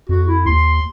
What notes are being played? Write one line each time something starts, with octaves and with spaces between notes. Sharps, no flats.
F2 F#4
E4
D#2 C6